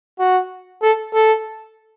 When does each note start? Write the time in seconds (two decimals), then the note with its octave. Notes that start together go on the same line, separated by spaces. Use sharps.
0.20 F#4
0.82 A4
1.14 A4